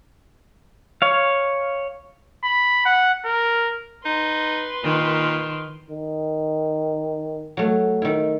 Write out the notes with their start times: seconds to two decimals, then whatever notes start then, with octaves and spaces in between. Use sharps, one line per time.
1.02 C#5 F5
2.44 B5
2.85 F#5
3.25 A#4
4.05 D#4 B4 C6
4.83 A#2 D#3
5.90 D#3
7.57 F#3 A3
8.02 D#3 E4